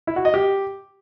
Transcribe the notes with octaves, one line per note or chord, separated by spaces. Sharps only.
E4
F#4
D#5
G4